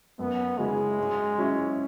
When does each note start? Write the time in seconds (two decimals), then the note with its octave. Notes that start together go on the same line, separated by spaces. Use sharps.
0.19 F#2 B3
0.58 C#3 F#3 G#3 C#4 E4
0.98 G#2
1.38 F#3 C#4 E4